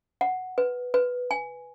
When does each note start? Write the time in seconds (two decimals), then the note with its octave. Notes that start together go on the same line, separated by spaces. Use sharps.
0.21 F#5
0.58 B4
0.94 B4
1.31 G#5